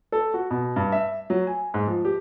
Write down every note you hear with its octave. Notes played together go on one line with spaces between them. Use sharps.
A4
F#4
B2
G2
E5
F#3
G#5
G#2
F3
G4